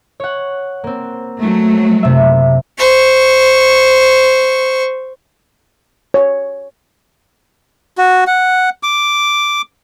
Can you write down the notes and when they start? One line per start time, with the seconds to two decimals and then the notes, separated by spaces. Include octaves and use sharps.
0.20 C#5 F#5
0.84 A#3 C4
1.39 F#3 A3
2.03 F#1 C3 E5
2.78 C5 C#6
6.14 C#5
7.98 F#4
8.27 F#5
8.83 D6